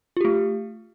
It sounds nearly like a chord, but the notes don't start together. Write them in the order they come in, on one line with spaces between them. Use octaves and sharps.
F4 G4 A3